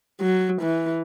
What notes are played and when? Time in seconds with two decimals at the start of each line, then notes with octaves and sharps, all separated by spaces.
0.20 F#3
0.61 E3